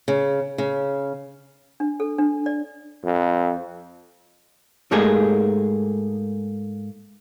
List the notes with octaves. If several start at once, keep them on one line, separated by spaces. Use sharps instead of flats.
C#3
C#3
D4
A4
D4
D5
F2
G#2 A3 A#3 G4 G#4